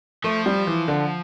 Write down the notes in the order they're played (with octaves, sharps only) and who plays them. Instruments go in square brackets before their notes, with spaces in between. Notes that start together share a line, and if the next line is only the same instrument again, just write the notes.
[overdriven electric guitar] F3 [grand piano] A3
[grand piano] G3
E3
D3